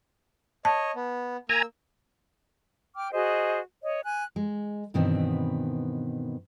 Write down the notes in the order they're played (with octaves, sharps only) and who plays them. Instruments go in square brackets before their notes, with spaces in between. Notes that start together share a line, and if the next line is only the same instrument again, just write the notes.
[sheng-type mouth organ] C#5 D#5 [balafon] A5
[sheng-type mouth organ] B3
[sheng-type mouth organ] A#3 E6 [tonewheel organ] G#5 A#5
[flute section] G5 D6 F6
F#4 G#4 C5 D#5
C#5 D#5
G#5 F#6
[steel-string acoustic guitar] G#3
G2 B2 D#3 E3 B3 C4